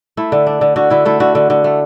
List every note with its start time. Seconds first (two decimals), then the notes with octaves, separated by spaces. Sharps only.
0.17 A3 E4
0.32 D3
0.47 D4
0.61 D3
0.76 D3 F#4
0.90 D3 E4
1.05 A3 E4
1.20 D3 F#4
1.35 D3
1.50 D3
1.64 A3